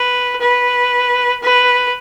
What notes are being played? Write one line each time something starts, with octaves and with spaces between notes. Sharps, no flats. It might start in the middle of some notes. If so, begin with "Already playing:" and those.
Already playing: B4
B4
B4